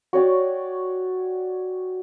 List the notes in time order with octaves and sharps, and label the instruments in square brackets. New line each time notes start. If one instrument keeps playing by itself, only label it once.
[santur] F#4 C#5 D5 G5